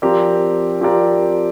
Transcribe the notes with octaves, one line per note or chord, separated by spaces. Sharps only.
F3 C4 G4 A#4 D5
F3 C4 G4 A#4 D5